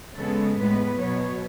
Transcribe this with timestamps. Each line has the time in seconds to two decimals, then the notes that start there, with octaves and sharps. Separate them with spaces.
0.17 C#3 G#3 B3 A4
0.57 A2 G#3 B3 B4
0.97 B2 F#3 B3 C#5